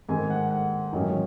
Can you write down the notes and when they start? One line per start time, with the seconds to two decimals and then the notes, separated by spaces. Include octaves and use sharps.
0.09 G#2 D#3 G#3 C4 G#5
0.30 F#5
0.51 F#5
0.93 A1 G#2 D#3 F#3 C#4 D#5